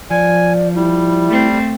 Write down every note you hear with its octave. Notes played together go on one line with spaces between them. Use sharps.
F3 D5 G#5
G3 E4
A3 C4